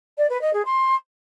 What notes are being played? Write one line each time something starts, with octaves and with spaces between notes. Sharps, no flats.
D5
B4
D#5
G#4
C6